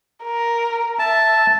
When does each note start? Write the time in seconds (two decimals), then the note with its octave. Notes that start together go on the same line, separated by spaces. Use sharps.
0.24 A#4
0.99 E5 A5